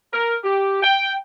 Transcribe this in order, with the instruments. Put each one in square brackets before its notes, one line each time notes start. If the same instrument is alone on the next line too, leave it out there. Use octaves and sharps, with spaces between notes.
[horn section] A#4
G4
G5